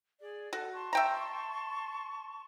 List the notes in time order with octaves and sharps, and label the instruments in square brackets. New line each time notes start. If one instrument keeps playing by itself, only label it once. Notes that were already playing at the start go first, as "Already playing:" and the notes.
[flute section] G#4 D5
[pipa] F#4 [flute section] A4
[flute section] A5 C6 C#6
[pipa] E5 G5 A#5